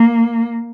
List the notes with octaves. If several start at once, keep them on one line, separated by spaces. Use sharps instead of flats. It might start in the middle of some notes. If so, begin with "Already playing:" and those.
Already playing: A#3